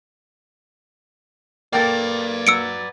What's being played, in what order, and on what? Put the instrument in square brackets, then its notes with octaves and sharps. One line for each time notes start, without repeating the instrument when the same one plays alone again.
[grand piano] A#3 A6 [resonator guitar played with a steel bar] A4 G5 [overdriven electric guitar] B4 D5
[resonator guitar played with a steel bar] F#3 [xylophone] E6 C#7 D7